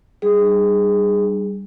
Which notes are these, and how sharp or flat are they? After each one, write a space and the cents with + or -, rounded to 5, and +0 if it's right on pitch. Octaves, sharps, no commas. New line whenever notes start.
G3 +0 D4 +40 G#4 -10